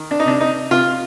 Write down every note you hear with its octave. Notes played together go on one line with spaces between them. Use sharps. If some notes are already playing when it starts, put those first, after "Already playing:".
Already playing: D#3
D4
D#4
C3 D4
D#4
C3 F4